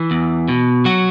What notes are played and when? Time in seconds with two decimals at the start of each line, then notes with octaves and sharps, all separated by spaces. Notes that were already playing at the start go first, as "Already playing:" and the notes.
Already playing: E3
0.11 E2
0.48 B2
0.85 F#3 F#4